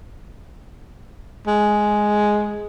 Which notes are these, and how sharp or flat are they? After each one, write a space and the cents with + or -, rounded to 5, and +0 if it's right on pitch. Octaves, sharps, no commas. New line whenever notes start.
G#3 +5